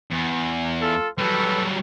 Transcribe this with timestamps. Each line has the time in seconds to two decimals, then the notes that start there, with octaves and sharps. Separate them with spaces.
0.11 E2
0.81 F4 A4
1.18 F#3 G3 A4 B4